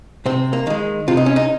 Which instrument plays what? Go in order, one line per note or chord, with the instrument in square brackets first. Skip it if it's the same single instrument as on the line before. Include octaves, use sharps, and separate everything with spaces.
[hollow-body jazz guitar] C3 C4
A#3
D#3 G#3
C3 F4
D#4
C#4
D#4